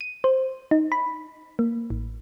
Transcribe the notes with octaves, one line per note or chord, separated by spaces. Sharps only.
D#7
C5
D#4
B5
A#3
A1